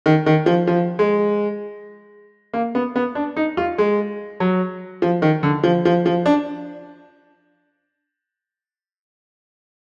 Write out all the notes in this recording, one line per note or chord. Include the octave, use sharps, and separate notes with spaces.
D#3
D#3
F3
F3
G#3
A#3
B3
B3
D4
D#4
F4
G#3
F#3
F3
D#3
D3
F3
F3
F3
D4